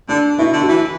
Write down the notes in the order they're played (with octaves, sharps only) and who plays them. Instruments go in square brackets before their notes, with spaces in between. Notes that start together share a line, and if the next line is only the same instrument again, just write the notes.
[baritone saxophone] D3 [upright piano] D4
[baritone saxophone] B2 [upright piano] E4
[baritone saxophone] D3
[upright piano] F#4
[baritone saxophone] E3 [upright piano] E4